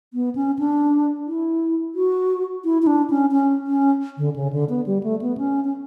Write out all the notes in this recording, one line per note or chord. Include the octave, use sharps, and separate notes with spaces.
B3
C#4
D4
E4
F#4
E4
E4
D4
C#4
C#4
C#4
D3
C#3
D3
B3
G3
A3
B3
C#4
C#4